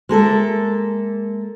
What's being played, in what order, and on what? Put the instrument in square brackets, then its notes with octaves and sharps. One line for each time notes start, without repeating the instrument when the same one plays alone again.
[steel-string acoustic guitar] G#3 A#3 A4 E5